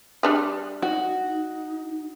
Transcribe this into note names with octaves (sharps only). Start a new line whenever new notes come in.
G3 D4 G#4
D#4 F#4
D#4